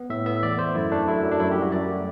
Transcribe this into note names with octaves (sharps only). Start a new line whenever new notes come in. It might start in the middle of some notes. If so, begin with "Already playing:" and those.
Already playing: B3
A2 E5
B3 E5
E2 D5
A3 C5
F#2 E4
A3 D4
F#2 E4
F#3
D4
F#2 E4
G4
G3
F#4
F#2 D5
A3